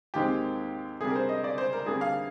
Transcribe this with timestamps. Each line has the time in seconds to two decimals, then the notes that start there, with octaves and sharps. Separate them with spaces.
0.14 D#2 D#3 G#3 C4 G4
1.00 C3 G3 D4 G#4
1.10 A#4
1.16 C5
1.29 D#5
1.44 D5
1.58 C5
1.73 A#4
1.86 F2 D3 G3 A#3 D4 G#4
2.01 F5